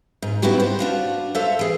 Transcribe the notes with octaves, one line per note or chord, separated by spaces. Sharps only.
G#2
B3 C4 D#4 E4 F#4 G4
C5
D4 F4 F#4
A4 C5 C#5 E5 F5
E3 G#4